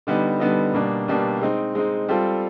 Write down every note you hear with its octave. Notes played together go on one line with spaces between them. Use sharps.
D3 G3 B3 D#4
D3 G3 B3 D#4
B2 G3 A#3 D4
B2 G3 A#3 D4
G#3 C4 D#4
G#3 C4 D#4
G3 C4 F4 A4